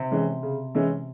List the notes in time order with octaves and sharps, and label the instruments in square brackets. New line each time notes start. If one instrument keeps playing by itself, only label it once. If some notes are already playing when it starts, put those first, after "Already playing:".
Already playing: [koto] C3
[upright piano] E3 G#3 C#4
C#3
E3 G#3 C#4 E4